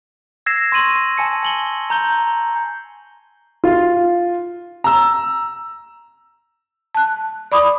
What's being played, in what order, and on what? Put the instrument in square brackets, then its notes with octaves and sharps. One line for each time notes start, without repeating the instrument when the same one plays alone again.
[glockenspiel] E6 G#6 A#6 C7 E7
C6 C#6 D#7 F#7
G#5 A5 C#7
G#5 F#7 G7
A#5 G6 G7
[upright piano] F4
[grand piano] A#5 E6
[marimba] A5 F#6
D5 B5 D6 D#6